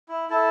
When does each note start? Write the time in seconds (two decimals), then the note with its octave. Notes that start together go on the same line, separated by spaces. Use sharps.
0.08 E4
0.29 E4 A4